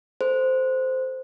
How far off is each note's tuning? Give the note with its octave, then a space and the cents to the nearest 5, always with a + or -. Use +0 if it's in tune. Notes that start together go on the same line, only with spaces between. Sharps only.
A4 +0 C5 -10